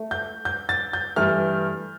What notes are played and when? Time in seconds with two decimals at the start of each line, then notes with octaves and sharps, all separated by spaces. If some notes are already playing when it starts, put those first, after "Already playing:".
Already playing: A3
0.11 G6
0.45 G6
0.69 A6
0.93 G6
1.16 G2 E3 A3 F6